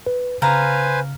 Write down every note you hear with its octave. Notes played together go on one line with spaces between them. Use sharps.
B4
C#3 B4 C5 F5 G#5 A#5